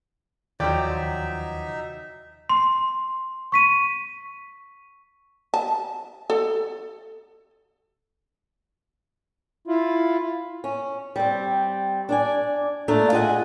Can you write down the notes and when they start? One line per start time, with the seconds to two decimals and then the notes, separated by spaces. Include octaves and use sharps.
0.60 D#2 F3 F#3 D#4 D5 E5 G5
2.49 C6
3.52 C#6 B6 D#7
5.54 A5
6.30 A4
9.67 E4 F4
10.64 C#4
11.16 G3 C4
12.09 D4 D5 G#5
12.88 A#2 A3 D4 D#4 A#5
13.12 F4 G#4 D#5 F#5 G#5